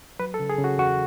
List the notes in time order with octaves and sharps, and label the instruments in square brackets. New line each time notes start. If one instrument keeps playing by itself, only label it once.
[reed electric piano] F#3 B4
A4
C#3
G#4
C#3
F#4
E2 F#4